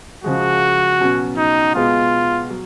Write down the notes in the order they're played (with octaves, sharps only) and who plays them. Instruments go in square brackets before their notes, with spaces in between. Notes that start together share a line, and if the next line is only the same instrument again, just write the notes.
[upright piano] C#3 F3 G#3 [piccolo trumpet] F#4
[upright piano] B2 F#3 C#4
[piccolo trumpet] D#4
[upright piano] B2 G#3 B3 [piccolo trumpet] F4
[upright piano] F#3